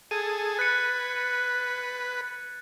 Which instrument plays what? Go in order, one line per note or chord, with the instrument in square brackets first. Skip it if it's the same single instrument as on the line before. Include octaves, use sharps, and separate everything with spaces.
[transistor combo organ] G#4 A4 [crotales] G#6 D#7
[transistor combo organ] B4 [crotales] F#6 A6 C#7